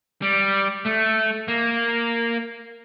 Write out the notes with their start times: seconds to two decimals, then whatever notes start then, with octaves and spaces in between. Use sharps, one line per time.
0.22 G3
0.85 A3
1.48 A#3